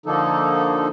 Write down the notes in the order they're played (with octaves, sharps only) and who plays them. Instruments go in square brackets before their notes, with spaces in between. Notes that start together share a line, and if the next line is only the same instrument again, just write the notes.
[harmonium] D3 F3 A#3 D#4 A4